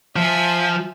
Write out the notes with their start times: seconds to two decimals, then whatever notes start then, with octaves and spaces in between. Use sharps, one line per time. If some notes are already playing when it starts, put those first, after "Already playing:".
0.16 F3 E5 G#5